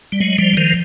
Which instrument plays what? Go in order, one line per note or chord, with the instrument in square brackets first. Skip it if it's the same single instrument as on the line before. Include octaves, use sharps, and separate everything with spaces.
[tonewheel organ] G3
F#3 G#3
F3 G3
D#3 F3